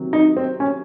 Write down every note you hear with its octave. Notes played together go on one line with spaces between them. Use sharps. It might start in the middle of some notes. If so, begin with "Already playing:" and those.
Already playing: C3 D#3 F#3
D#4
C4
C#4